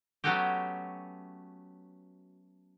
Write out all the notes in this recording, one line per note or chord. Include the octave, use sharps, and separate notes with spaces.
F#3 A3 B3 C#4 F#4 G4